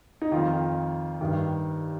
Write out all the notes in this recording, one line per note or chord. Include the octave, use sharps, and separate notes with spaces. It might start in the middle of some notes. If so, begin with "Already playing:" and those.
D#4
F2 D#3 F4
G2 D#3